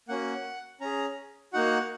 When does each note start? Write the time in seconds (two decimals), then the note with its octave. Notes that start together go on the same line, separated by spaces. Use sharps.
0.08 A#3 C#4 F#4 F#5
0.81 C#4 G#4 A#5
1.53 A#3 D#4 F#4 F#5